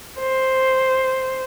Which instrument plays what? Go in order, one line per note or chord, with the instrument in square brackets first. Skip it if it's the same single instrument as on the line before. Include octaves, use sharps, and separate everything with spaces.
[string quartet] C5